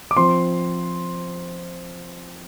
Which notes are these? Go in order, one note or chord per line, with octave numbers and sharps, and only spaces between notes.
D6
F3 C4 C6